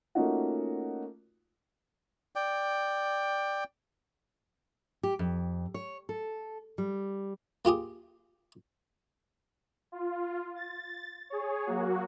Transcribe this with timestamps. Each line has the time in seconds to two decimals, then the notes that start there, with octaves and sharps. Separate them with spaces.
0.15 A3 A#3 C#4 D#4 F4 F#4
2.36 D5 G5
5.03 G4
5.19 F2
5.74 C#5
6.09 A4
6.78 G3
7.65 A#3 F4 G4 G#4
9.92 F4
10.56 A6
11.30 G#4 C#5
11.66 F#3 A#3 F#4